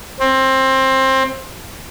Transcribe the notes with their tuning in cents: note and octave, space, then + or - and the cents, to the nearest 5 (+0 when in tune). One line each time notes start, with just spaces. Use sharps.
C4 +20